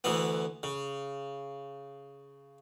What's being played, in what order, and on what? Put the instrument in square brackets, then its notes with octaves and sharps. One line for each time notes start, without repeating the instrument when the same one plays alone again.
[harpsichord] D2 E3 B3
C#3